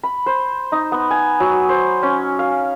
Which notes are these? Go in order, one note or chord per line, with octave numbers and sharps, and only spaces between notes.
B5
C5
D#4
B3
G#5
F#3
C5
C#4
F5